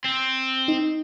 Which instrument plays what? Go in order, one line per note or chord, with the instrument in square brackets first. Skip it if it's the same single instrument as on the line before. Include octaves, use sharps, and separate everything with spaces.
[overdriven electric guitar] C4
[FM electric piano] D#4